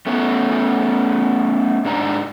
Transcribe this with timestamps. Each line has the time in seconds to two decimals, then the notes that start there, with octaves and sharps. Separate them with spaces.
0.07 A3 B3 C#4
1.85 G#2 D4 A#5